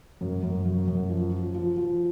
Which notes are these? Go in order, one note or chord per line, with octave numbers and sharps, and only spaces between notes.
F#2
F#2
F#3
F#2
F3
F3
F3
F3